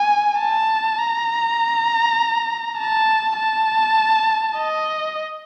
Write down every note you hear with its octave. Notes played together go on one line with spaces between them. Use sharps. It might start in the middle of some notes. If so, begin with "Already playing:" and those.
Already playing: G#5
A5
A#5
A5
A5
D#5